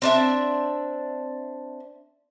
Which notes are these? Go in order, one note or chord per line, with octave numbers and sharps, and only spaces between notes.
C4 D4 E5